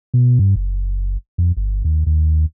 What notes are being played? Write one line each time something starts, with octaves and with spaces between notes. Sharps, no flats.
B2
G2
F#1
F2
G1
D#2
D#2